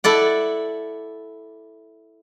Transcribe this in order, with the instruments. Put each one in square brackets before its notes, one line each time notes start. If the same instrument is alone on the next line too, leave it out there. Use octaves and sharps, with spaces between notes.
[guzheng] E4 A4 D5 F#5